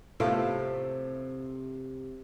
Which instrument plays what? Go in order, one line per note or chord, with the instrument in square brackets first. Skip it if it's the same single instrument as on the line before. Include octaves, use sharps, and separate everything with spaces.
[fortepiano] A2 A3 F4 [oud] C3